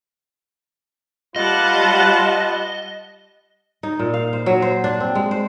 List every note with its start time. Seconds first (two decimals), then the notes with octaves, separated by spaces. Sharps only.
1.36 G3 F4 B4 D#5 F#5 A5
3.83 D#4
3.99 A#2
4.14 F5
4.33 C5
4.46 F#3
4.62 C5
4.84 D4
5.00 C4
5.15 G#3
5.31 C5